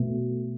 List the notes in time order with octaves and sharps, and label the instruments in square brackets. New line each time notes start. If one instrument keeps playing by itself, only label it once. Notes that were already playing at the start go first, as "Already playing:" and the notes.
Already playing: [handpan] B2 A3